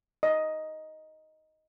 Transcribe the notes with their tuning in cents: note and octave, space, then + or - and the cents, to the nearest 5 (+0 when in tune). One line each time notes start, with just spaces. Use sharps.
D#5 +5